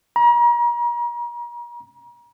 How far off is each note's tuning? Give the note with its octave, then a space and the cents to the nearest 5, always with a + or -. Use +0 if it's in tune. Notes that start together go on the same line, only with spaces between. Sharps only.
A#5 +40